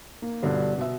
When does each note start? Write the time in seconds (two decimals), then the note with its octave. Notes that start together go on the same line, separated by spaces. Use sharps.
0.22 A#3
0.42 G1 G2 B2 D3
0.78 B2 E5